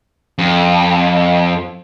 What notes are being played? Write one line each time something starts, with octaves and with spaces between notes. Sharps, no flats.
F2